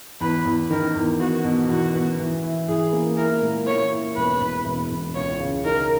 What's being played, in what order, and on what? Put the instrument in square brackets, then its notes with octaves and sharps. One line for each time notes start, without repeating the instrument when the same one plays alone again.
[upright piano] E2 [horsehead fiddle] B4
[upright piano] E2
[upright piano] D#3 [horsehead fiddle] A#4
[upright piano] E2
[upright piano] B3 [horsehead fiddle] F#4
[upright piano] B2
[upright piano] E2 [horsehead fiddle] F#4
[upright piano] B3
E3
E4
[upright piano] E3 [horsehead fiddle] G#4
[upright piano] A#3
[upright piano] E4 [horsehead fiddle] A#4
[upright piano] A#2
[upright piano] A#3 [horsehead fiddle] C#5
[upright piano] E4
[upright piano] E1 [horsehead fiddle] B4
[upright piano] E1
E1
E1
[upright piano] C#2 [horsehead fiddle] C#5
[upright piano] C#3
[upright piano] D#4 [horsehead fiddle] A#4